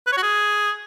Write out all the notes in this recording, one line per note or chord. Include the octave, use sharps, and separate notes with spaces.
B4
C#5
F#4
G#4